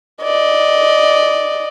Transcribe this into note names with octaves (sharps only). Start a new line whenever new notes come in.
D5 D#5